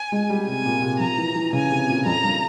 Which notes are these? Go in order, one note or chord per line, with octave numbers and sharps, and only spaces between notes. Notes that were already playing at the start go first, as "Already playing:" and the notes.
Already playing: G#5
G#3
G3
C3 G#5
A#2
C3
F3 A#5
E3
E3
C#3 G#5
C3
A#2
F2 A#5
G2